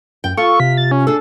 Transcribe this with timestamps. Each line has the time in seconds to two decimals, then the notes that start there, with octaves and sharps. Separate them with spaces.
0.24 F#2 G5
0.37 F4 A4 C#6
0.60 C3 B6
0.77 A6
0.91 C#4
1.07 D4 G#4 A4